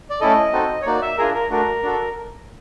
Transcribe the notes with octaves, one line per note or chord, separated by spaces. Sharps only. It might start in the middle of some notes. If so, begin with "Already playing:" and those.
D5
A3 C#4 E4 A4 D#5
C4 D#4 F#4 A4
C#5
A#3 D#4 F#4 D5
E5
D4 F4 G#4 A#4
A#4
A3 D4 F#4 A#4
D4 F#4 A4